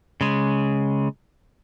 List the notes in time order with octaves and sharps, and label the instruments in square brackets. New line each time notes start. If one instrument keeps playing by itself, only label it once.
[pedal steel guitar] C#3 G#3